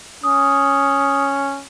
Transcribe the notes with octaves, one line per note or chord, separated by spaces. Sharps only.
C#4 D#6